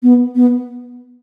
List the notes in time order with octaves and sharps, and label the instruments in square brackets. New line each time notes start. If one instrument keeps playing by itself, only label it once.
[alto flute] B3
B3